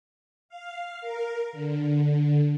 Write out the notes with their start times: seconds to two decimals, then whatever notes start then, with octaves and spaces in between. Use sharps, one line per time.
0.49 F5
1.01 A#4
1.53 D3